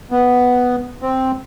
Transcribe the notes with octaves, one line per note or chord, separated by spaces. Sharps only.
B3
C4